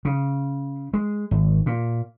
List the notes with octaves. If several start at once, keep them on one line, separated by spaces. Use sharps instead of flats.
C#3
G#3
G#1
A#2